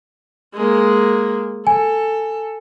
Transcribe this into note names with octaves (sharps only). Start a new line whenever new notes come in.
G#3 A#3
A4 G#5